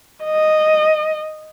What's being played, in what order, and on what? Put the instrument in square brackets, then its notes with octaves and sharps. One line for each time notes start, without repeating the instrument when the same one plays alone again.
[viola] D#5